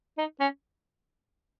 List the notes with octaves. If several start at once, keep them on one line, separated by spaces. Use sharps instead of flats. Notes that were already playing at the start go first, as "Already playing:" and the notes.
D#4
C#4